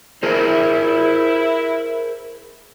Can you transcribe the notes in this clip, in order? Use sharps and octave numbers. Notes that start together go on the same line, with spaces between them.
E4 G#4 A#4 C5